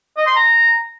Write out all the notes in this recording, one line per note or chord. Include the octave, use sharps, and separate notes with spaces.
D#5
C6
A#5